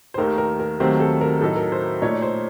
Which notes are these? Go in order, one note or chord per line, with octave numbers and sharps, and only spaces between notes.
C5
D#2 D#3 A3 D#4 A#4
A#4
A#4
D#2 D#3 F#3 A3 C4 C5
A4
A#4
A2 F#3 A3 D#4 A4
A#4
C5
A#2 A3 D#4 C#5
C5